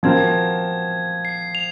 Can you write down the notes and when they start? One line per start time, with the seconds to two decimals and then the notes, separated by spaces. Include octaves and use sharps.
0.03 F3 C4 F#4 A#4 G#6
1.25 C7
1.55 F7